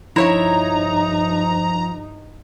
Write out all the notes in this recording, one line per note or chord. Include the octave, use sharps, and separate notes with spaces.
G2 F3 D#4 E4 C#5 E5 A#5